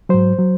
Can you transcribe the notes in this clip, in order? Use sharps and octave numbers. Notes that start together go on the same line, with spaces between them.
G#2 F#3 C5
F#3